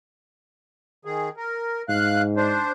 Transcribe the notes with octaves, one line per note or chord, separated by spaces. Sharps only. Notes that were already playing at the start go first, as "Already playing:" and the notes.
D#3 G#4
A#4
G#2 F5 F#6
D4 C5